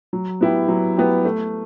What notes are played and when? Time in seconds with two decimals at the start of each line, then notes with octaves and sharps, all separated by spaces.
0.13 F#3
0.41 B3 E4 G4
0.68 F#3
0.97 B3 E4 G4
1.25 A3